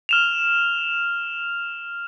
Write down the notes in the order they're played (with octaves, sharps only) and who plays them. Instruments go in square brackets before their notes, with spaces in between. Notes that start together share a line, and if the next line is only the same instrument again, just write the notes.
[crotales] F6 E7 F7